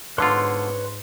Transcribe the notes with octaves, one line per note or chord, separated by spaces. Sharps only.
G#2 B2 D3 F4 B4 C#5 C6